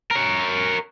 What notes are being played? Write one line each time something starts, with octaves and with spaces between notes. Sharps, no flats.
A#4 C#5